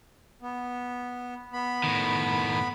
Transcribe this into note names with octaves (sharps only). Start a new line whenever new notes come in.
B3
B3 B5
A2 D#3